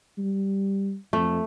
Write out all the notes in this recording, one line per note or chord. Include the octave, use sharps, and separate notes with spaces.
G3
F2 A3